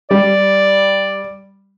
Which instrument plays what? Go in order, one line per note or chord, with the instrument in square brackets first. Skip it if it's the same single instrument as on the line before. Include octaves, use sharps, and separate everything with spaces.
[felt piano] G3 [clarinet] D5